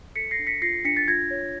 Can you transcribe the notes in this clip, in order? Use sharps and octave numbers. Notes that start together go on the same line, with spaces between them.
A4 B6 C#7
A#6 C7
D4
B6 C#7
F4 A#6 C7
D4 B6 C#7
A6 B6
F4 G#6 A#6
C#5